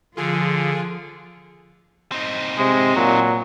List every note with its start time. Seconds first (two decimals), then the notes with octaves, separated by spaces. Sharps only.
0.17 D3 F3 F4 G#4
2.12 C4 D#4
2.57 C3 G#3
2.96 A#2 F#3